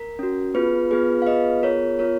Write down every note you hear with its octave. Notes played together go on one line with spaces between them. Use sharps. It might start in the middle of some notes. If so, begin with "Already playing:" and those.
Already playing: A#4
C#4 F#4
B3 F4 G#4 B4
B3 F4 G#4 B4
F5
B3 F4 G#4 B4 D#5
B3 F4 G#4 A#4 C#5
B3 F4 A#4 C#5